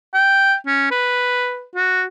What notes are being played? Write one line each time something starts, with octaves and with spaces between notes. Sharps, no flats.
G5
C#4
B4
F#4